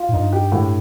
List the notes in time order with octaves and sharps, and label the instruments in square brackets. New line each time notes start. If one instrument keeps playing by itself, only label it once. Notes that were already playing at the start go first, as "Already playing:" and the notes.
Already playing: [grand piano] F4
[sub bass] A2
[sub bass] G2 [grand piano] D#4
[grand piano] G4
A2